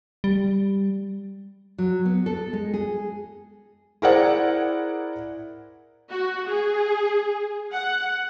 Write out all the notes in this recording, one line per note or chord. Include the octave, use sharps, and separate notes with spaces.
G3
F#3
B3
A4
G#3
G#4
E4 G#4 A#4 C5 D5 F#5
F#4
G#4
F#5